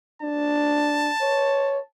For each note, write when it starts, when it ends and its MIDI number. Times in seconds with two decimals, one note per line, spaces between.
0.22 1.10 62
0.22 1.87 81
1.21 1.79 73